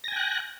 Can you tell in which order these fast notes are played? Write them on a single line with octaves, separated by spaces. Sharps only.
A#6 G#5 G5 F#6